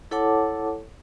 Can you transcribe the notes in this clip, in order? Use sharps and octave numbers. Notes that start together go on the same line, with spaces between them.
E4 A4 C#5 F#5 A5 D6